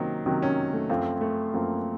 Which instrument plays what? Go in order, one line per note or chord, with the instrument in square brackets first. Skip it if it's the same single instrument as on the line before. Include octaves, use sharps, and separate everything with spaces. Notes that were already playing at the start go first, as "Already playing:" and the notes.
Already playing: [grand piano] C3 D#3 F#3 [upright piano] A#3 C4 C#4
[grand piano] C3 D#3 F#3 [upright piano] C#4
[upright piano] C#4
A3
[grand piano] F#2 F3 C4 F4 [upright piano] A3
[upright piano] A3
[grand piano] F#2 F3 C4 F4 [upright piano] A#3